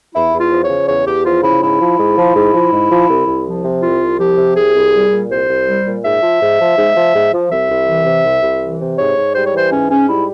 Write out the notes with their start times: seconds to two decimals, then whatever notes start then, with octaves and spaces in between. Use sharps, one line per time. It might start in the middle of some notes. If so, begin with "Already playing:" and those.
0.14 E2 E4
0.33 E2
0.39 F4
0.51 F3
0.64 C#5
0.70 C#3
0.88 E2 C#5
1.06 E2 G4
1.25 F3 F4
1.43 C#3 E4
1.62 G#2 E4
1.80 F3
1.98 G#2
2.17 F3
2.35 G#2
2.54 F3
2.72 G#2
2.91 F3
3.09 C2
3.27 C2
3.46 F3
3.64 C3
3.83 C2 F4
4.01 C2
4.20 F3 G4
4.38 C3
4.56 C2 G#4
4.75 C2
4.93 G3
5.11 A#2
5.30 C2 C5
5.48 C2
5.66 G3
5.86 A#2
6.03 G#2 E5
6.22 F3
6.41 G#2
6.59 F3
6.77 G#2
6.96 F3
7.14 G#2
7.32 F3
7.51 C2 E5
7.69 C2
7.88 E3
8.06 C3
8.24 C2
8.43 C2
8.62 E3
8.80 C3
8.98 G#2 C#5
9.17 G#2
9.35 G3 C5
9.46 C#5
9.54 E3 C5
9.72 G#2 C#4
9.90 G#2 C#4
10.08 G3 E4